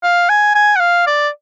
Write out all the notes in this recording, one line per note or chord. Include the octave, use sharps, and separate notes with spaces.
F5
G#5
G#5
F#5
F5
D5